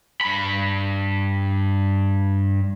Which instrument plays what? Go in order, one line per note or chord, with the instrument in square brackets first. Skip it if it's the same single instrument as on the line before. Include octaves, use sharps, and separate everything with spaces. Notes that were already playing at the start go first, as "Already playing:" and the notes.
[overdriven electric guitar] G2 B5